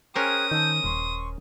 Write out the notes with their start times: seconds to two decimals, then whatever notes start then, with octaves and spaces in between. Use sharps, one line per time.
0.16 C#4 G#4 A#4 C5 G5 D#6 F#6
0.51 D#3 A5 E6 G6
0.84 D#1 C6 C#6